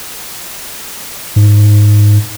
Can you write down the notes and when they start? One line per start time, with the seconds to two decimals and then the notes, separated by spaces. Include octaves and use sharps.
1.36 G#2